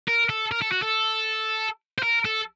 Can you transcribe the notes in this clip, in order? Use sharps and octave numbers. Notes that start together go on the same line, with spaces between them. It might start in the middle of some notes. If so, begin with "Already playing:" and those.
A#4
A4
A#4
A4
F#4
A4
C5
A#4
A4